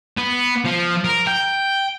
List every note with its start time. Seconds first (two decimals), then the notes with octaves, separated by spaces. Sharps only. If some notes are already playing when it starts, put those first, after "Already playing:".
0.17 B3
0.65 F3
1.05 A#4
1.27 G5